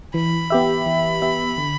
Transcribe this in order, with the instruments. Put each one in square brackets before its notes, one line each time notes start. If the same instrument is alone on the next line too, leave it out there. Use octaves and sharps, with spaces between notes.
[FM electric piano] E3 [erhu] B5
[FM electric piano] B3 G4 E5
E3
B3 G4 E5
D3